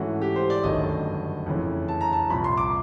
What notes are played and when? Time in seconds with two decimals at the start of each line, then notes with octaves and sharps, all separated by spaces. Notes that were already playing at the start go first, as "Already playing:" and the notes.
Already playing: G#2 E3 A3 C#4 F#4
0.22 G4
0.36 C5
0.50 D5
0.64 G1 F#2 D#3 F#3 A3 D#5
1.46 F2 C#3 E3 A3
1.88 A5
2.01 A#5
2.13 A5
2.29 C2 A#2 F3 B5
2.44 C6
2.58 D6